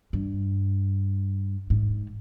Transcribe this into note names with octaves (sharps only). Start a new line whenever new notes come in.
G2
G#2